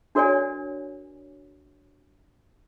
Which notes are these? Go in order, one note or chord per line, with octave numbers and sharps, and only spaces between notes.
D4 F#4 A#4 C#5 D5 G#5